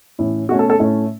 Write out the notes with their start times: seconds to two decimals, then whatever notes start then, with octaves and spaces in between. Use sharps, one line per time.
0.19 A2 E3 C#4
0.49 B2 F#4
0.52 A3 C#4
0.59 A4
0.70 A4
0.79 A2 A3 C#4